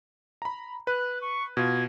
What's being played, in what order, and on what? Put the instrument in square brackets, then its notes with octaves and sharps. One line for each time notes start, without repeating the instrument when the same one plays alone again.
[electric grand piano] A#5 B5
[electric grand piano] B4 [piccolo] F#6
[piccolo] C#6
[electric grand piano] B2 F4 [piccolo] G#6